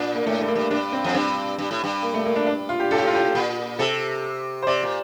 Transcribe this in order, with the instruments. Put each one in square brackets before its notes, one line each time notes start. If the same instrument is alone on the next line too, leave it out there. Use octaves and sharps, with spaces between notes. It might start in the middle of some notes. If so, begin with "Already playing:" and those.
Already playing: [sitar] A#2 [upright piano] D4
[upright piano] A#3
[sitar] A2 [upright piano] A3
[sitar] G2
[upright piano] A#3
[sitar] G2
[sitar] G2 [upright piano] D4
[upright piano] C4
[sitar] F2
[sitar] G2 [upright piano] C4
[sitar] G2
A2
G2
[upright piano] A#3
A3
A#3
D4
D4
F4
G4
[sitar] A2 [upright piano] A4
[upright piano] G4
F4
G4
[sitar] A#2
[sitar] C3 [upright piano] A4
[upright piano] C5
[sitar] C3 [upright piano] D5
[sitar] A#2